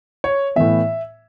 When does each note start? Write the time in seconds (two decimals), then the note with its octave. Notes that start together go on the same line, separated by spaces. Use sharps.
0.24 C#5
0.56 A2 E3 B3 E5